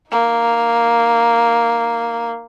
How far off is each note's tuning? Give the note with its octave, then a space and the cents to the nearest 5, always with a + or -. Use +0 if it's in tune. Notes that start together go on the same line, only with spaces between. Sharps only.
A#3 +0 D#4 +0